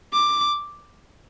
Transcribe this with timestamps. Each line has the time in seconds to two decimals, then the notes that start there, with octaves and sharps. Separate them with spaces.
0.13 D6